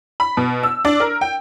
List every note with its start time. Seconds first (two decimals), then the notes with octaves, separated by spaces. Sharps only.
0.20 B5
0.37 B2
0.63 E6
0.85 D4
1.00 A#4
1.21 G5